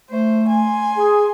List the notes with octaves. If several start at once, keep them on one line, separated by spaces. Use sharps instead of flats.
A3 C5
G#5 C6
G#4